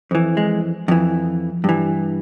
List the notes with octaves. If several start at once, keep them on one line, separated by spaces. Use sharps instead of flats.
F2 E3
G#3
F2 E3
G2 E3